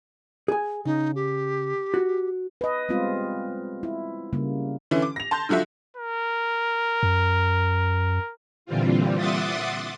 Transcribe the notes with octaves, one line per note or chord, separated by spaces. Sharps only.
G#4 G#5
C#3 D#4
G4
F#4
B4 D#5
G3 G#3 B3 C4 F4
E4
C#3 G3 A#3
D3 E3 C#4 E4
D6
A#6 F7
A5 C6 G6
D3 F3 F#3 F#4 E5
A#4
F#2
A#2 D3 E3 G3 C4 F4
E5 F#5 C6 D6 D#6 A6